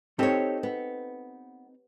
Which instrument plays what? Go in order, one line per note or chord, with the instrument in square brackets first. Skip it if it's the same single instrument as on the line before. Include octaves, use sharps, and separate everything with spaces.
[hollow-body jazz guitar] C4 D#4 A4 [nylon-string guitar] G4 C#5
[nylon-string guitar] B3